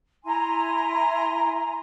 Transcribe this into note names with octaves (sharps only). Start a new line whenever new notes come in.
E4 G#5 A#5 C6